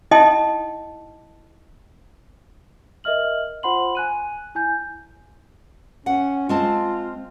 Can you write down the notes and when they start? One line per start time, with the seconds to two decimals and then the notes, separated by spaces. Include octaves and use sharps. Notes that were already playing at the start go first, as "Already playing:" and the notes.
0.11 D#4 E4 D#5 G5 A5 D#6
3.04 A#4 D#5 E5 F6 F#7
3.63 F4 C5 F#5 B5 C6 F#7
3.95 G#5 F#6 D#7
4.55 E4 G#5 G6
6.06 C#4 F#5
6.49 G#3 C4 F4 A5